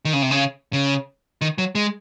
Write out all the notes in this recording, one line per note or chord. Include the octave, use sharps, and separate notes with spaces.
D#3
C#3
C3
C#3
C#3
D#3
F#3
G#3